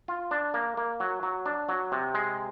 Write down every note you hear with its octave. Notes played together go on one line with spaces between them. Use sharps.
F4
D4
A#3
A#3
F#3
F#3
D4
F#3
C3
G#3